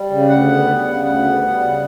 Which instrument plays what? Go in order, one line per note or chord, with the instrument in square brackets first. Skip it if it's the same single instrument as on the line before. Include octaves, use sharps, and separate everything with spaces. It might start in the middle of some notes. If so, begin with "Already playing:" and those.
Already playing: [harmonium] G3
C#3
D2 F#5
B3
G3
C#3
D2 F#5
B3
G3
C#3